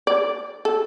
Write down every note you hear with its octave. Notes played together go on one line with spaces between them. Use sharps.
D5
A4